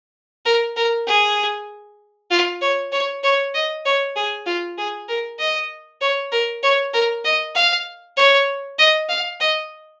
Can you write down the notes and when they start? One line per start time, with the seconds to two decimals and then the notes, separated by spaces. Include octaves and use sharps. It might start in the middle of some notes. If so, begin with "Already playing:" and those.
0.46 A#4
0.76 A#4
1.07 G#4
2.31 F4
2.62 C#5
2.92 C#5
3.24 C#5
3.54 D#5
3.85 C#5
4.16 G#4
4.47 F4
4.78 G#4
5.09 A#4
5.39 D#5
6.01 C#5
6.32 A#4
6.63 C#5
6.93 A#4
7.25 D#5
7.55 F5
8.17 C#5
8.79 D#5
9.09 F5
9.40 D#5